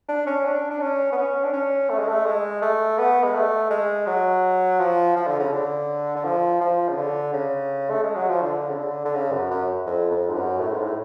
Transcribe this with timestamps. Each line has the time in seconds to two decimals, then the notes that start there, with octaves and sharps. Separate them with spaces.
0.09 D4
0.27 C#4
0.45 D4
0.71 D4
0.81 C#4
1.12 B3
1.18 C#4
1.44 D4
1.53 C#4
1.90 A3
1.99 G#3
2.08 A3
2.26 G#3
2.62 A3
2.98 B3
3.24 G#3
3.35 A3
3.71 G#3
4.07 F#3
4.79 F3
5.16 F3
5.28 D3
5.40 C#3
5.52 D3
6.16 D3
6.25 F3
6.61 F3
6.89 C#3
6.97 D3
7.33 C#3
7.90 A3
8.03 G#3
8.15 F#3
8.29 F3
8.42 D3
8.69 C#3
8.78 D3
9.05 D3
9.15 C#3
9.32 F#2
9.51 F#2
9.86 F2
10.11 F2
10.29 G#2
10.35 F#2
10.60 A2
10.73 G#2
10.84 A2